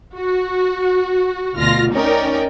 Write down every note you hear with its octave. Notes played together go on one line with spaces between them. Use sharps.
F#4
D2 B2 F4 F6 A#6
C#4 D#4 A#4 D5 G5